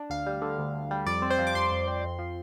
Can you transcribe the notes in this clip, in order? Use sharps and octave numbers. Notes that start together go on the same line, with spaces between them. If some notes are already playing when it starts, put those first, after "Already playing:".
Already playing: D4
D2 F5
G3
D3
D2
D2
G3
F2 D5
C4
C5
F3
D6
F2 C6
F2
C4
F2
F3